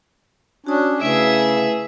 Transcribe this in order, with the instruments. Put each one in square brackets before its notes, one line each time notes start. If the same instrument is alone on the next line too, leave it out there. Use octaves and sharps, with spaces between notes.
[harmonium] C#4 D4 [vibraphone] F#4 D#6
[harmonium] C#3 [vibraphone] A3 E4 B4 [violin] G#4 E5